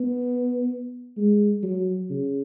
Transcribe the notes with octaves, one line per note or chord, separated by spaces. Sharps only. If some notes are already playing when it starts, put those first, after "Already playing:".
Already playing: B3
G#3
F#3
C#3